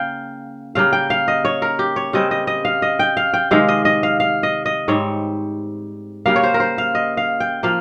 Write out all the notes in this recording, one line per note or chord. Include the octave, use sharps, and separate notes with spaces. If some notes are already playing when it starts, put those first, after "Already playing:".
Already playing: C#3 A#3 F5 G5
C#3 G3 A#3 F5
G5
F5
D#5
C#5
A#4
G4
C#5
C#3 G3 C4 D#5
D#5
D#5
F5
D#5
G5
F5
G5
C3 D#3 G#3 F5
D#5
D#5
F5
F5
D#5
D#5
G#2 G3 C4 C#5
C#3 G3 A#3 F5
C#5
C5
A#4
C5
F5
D#5
F5
G5
F3 A#3 F5